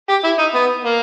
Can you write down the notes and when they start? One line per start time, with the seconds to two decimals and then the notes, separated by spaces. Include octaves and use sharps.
0.09 G4
0.24 E4
0.39 D#4
0.55 B3
0.84 A#3